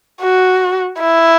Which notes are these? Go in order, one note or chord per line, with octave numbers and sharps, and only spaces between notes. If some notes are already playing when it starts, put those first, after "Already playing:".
F#4
E4